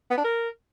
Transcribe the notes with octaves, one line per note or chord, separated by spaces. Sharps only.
B3
D4
A#4